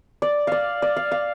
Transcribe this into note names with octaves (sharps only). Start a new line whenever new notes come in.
D5
D5 F5
D5
F5
F5